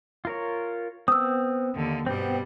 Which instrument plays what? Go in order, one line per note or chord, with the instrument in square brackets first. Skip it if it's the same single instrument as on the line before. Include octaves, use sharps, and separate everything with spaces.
[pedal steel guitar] F4 A#4 C#5
[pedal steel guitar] B3 C4 [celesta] D#6 E6
[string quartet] D#2 D3
[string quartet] G2 B2 G3 [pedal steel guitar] B3 C4